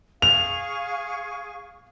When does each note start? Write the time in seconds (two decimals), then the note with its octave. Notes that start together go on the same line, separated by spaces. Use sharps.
0.22 G#4 F5 C#6 F7